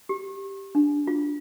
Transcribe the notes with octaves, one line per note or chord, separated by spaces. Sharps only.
G4
D4
F4